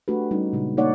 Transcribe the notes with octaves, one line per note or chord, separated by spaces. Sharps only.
A3 D4 F#4 G4 A4 B4
G3 C#4 D#4
A#2 C#3 G#3
A#3 D#4 C#5 D5 F#5